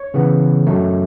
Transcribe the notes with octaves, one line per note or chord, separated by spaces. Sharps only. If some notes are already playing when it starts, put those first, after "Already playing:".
Already playing: C#5
C#3 E3 B3
F#2 F#3 A3